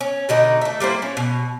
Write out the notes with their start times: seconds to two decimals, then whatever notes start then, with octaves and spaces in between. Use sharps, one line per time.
0.01 C#4
0.29 B2 D3 D#4
0.61 A3 E5
0.80 G3 A#3 E4 C5
1.02 C#4
1.17 B2